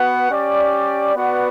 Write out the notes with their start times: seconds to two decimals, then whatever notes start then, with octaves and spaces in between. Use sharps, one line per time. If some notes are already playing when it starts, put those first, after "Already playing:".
Already playing: B3 F#4 B4 F#5
0.30 C#4 G4 D5
1.15 B3 F#4 B4 D5 F#5